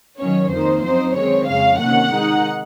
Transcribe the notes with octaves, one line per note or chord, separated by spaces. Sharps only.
D#3 F#3 C#4 C#5
F2 D#3 A#3 D#4 C5
F#2 F3 C4 D#4 C5
D#3 G#3 C4 C#5
F2 C#3 G#3 C#4 F5
C3 D#3 A#3 C#4 F#5
D#3 G#3 D#4